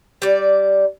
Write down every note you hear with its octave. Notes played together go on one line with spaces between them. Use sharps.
G3 D5